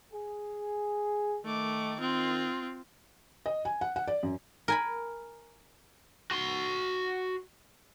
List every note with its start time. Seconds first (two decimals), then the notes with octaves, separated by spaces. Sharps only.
0.14 G#4
1.45 D#3 A3 D6
2.00 C4 F4
3.46 D#5
3.65 G#5
3.81 F#5
3.96 F#5
4.08 D5
4.23 F#2
4.68 A#4 G#5 B5
6.31 F#4 C6